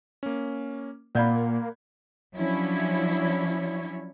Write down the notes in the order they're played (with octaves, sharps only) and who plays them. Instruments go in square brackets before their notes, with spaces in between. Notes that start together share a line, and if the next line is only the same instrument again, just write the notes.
[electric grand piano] A#3 C#4
[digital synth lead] A#2 [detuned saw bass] A#3 [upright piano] D5 F5 B5 [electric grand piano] F#5 G6 G#6
[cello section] F3 F#3 C#4 D4 E4 C#5